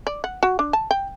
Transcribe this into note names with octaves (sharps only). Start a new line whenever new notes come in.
D5
F#5
F#4
D4
A5
G5